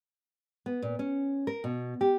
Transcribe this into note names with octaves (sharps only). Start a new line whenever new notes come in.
B3
A#2
C#4
A#4
B2
G4